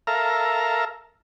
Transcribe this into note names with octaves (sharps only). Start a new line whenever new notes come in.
A4 A#4 E5 F5 A#5